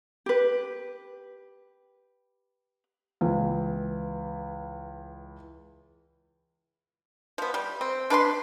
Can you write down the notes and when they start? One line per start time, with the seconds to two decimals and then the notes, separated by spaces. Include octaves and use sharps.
0.26 G4 B4
3.21 C#2 E3
7.38 F3 B3
7.54 G3
7.81 C4
8.10 D4 B4 F#5 C6